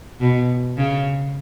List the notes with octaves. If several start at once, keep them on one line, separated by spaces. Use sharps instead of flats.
B2
C#3